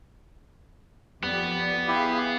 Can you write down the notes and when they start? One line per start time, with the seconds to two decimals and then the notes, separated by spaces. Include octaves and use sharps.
1.23 F2 B3 G4 D5
1.88 E4 G4 G#4 F5